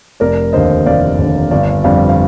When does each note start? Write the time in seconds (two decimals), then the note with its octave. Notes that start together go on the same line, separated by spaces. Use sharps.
0.20 F1 A#4 D5
0.53 D#2 D3 C5 D#5
0.86 F1 D5 F5
1.18 D#2 D3
1.51 G1 D5 F5
1.84 F2 D3 G3 D5 F5
2.09 F5